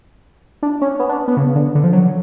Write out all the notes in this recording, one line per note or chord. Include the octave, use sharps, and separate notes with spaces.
D4
C#4
B3
D4
B3
C#3
D3
D3
F3
F#3